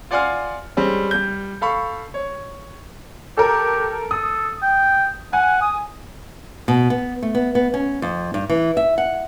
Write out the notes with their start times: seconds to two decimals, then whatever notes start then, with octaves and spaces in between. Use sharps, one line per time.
0.11 F4 D5 F#5 G#5 C6 F6
0.77 G3 G#3 C4 C#4
1.11 G3 G6
1.61 A4 F5 B5 C#6
2.14 C#5
3.37 G4 A4 A#4
4.11 A4 D#6
4.62 G5
5.33 F#5 G#5
5.62 D#6
6.68 B2
6.90 B3
7.22 A3
7.35 B3
7.55 B3
7.74 C#4
8.02 F2
8.34 G2
8.49 E3
8.77 E5
8.98 F#5